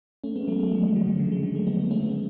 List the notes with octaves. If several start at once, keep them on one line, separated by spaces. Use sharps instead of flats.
A3 C#4
G#3 B3
F#3 A3
F#3 A3
F3 G#3
F3 G#3
D3 F#3
D3
C#3 F3
F3 G#3
D3 F#3
F#3 A3
G#3 B3
G#3 B3
A3 C#4
G#3 B3